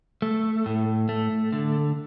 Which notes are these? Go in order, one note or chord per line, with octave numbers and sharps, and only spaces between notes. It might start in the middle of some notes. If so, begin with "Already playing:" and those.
A3
A2
A3
D3